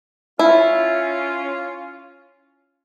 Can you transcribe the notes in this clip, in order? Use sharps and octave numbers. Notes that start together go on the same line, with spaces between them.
C#4 E4 F4